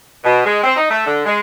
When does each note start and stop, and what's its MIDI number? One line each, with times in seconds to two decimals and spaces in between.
0.25 0.42 47
0.45 0.61 56
0.64 0.72 60
0.76 0.89 63
0.90 1.06 57
1.07 1.24 50
1.26 1.39 56